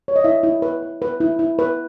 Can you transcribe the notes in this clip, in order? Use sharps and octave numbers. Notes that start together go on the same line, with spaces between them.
C#5
D#5
E4 E5
E4
B4
B4
B4
E4
E4
B4